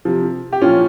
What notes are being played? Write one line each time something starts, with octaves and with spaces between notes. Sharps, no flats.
C3 F3
G4
A#2 F3 C#4 F4